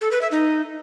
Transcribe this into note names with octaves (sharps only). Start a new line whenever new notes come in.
A4
B4
E5
D#4